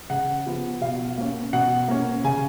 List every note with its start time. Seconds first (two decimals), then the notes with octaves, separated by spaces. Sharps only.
0.10 C#3 F#5
0.46 F3 B3
0.81 B2 F5
1.18 A#3 C#4
1.53 B2 F#5
1.88 A#3 C#4
2.24 C#3 G#5